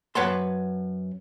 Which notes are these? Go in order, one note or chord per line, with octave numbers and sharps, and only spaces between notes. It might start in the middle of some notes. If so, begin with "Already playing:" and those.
F#2 B4 C#5 F#5 A5 C6